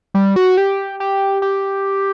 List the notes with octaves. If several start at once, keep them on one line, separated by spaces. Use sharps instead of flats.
G3
F#4
G4
G4
G4